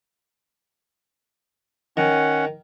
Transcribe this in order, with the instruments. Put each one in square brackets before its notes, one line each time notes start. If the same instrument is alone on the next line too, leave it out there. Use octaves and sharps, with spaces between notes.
[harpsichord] D#3 [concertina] C#4 F#5